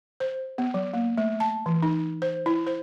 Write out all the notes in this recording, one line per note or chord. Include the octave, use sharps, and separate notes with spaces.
C5
B3
F#3
A#3
A3
A5
E3
D#4
C5
E4
C5